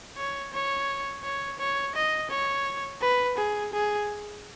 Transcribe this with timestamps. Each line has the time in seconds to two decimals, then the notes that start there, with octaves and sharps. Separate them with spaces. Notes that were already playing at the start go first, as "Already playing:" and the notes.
0.17 C#5
0.53 C#5
1.23 C#5
1.59 C#5
1.95 D#5
2.30 C#5
3.01 B4
3.37 G#4
3.73 G#4